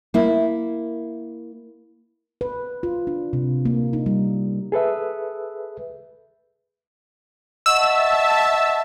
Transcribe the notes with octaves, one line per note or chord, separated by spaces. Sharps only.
A#3 E4
B4
F4
D4
C3
A#3
D#4
G3
G#4 A4 B4 E5
D#5 E5 F#5 A5 C#6 E6